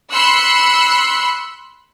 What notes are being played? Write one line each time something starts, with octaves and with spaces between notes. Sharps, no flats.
B5 C6 E6 F#6 C#7